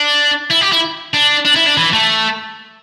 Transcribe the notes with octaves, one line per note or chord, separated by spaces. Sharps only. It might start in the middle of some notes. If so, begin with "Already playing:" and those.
Already playing: D4
E4
G4
E4
D4
D4
E4
D4
E3
A3